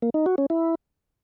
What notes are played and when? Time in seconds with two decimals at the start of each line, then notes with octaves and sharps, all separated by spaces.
0.02 A#3
0.14 D#4
0.26 F#4
0.38 C#4
0.50 E4